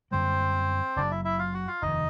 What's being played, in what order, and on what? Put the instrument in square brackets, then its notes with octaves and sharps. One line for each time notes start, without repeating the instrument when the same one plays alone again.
[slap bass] F#2 D3 G3 A#3 [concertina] C4 C5
[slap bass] F#1 F#2 C#3 F#3 [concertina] D4 D5
[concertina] E4 E5
E4 E5
F4 F5
F#4 F#5
F4 F5
[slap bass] F1 D#2 D#3 [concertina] D#4 D#5